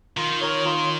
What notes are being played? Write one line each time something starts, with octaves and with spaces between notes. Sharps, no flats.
D#3 F4
A#4 C#5
F4